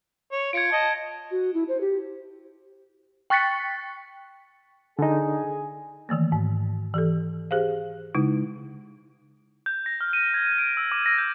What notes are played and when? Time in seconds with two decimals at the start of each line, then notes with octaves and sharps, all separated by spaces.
0.32 C#5
0.53 F4 G#6 C#7 D7
0.72 D#5 A5
1.31 F#4
1.54 E4
1.69 C5
1.81 G4
3.30 G5 C#6 F#6 A6 B6 C#7
4.99 D3 D#4 G#4 G#5
6.09 D#3 E3 A3 A#3
6.32 G#2
6.94 E3 G4 A4
7.51 G4 G#4 C5 F5
8.15 C#3 G#3 D#4 E4
9.66 G6
9.86 A#6
10.01 F6
10.13 D#7
10.34 G#6
10.58 D7
10.77 E6
10.92 D6
11.06 A#6
11.18 G6